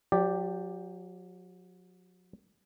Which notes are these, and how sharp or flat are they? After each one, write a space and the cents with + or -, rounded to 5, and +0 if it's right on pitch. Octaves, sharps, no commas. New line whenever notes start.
F#3 -40 G4 +0 D5 +0